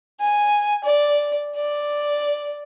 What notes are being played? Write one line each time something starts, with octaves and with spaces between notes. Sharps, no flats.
G#5
D5
D5